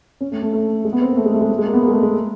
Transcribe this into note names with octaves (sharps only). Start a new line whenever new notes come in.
C#4
A3
A3
A3
G#3
B3
C4
A#3
A3
G#3
A3
G#3
A3
G#3
A#3
B3
A#3
G#3
A3
G#3